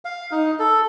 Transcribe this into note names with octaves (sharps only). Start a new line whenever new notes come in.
F5
D#4
A4